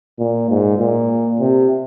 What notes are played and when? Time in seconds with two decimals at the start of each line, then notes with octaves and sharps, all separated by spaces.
0.19 A#2
0.50 G#2
0.79 A#2
1.40 C3